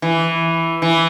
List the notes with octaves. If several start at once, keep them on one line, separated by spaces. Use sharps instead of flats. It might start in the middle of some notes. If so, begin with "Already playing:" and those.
E3
E3